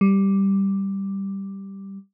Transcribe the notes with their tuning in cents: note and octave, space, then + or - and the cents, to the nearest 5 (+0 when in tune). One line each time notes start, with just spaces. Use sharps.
G3 +0